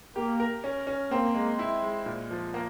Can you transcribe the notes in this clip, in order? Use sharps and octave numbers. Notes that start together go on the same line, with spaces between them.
A#3 G4
A#4
C#4
C#4
A#3 C4
G#3
E4
G#3
A#2
F3
A#3